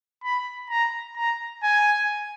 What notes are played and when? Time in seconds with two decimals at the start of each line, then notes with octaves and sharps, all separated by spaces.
0.24 B5
0.70 A#5
1.17 A#5
1.63 G#5